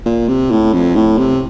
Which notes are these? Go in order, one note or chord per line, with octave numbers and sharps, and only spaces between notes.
A#2
C3
A2
F2
A2
C3